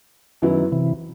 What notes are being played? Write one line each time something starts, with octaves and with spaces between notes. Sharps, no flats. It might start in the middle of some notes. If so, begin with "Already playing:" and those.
F#2 D#3 F#3 B3 E4
C3 E3